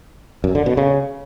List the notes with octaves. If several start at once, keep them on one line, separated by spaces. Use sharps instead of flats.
F#2
D3
B2
C#3